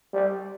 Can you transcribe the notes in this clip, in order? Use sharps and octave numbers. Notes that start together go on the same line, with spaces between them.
G3